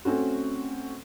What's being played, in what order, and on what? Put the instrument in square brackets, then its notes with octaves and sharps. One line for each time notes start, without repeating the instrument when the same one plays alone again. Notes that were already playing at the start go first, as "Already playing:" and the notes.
[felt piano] A3 C4 C#4 F#4